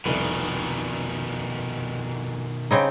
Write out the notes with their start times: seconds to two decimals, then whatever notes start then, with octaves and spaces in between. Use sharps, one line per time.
0.06 F1 C2 B2 D#3
2.71 C#3 C4 D#4 B5 G#6 D7